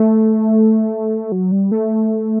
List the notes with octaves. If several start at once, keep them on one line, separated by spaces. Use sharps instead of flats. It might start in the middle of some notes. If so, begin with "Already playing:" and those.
Already playing: A3
F#3
G3
A3